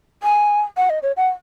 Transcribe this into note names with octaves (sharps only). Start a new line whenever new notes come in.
G#5
F#5
D#5
C#5
F#5